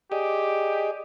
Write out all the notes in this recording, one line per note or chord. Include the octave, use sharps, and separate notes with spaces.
G4 G#4 D5 D#5